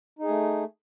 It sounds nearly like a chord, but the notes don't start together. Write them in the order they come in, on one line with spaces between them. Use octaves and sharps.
D#4 G#4 A3